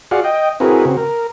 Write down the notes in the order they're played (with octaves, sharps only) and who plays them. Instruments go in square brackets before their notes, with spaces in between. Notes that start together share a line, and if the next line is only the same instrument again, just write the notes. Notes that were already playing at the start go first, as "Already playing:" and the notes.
[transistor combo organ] F4 F#4 G#4 D5 F5 F#5
D#5 G5
C4 E4 F#4 G#4 A#4 B4
C#3 C4 F#4
A#4